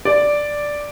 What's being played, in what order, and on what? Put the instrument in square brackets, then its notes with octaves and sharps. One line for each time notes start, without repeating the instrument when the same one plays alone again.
[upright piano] D5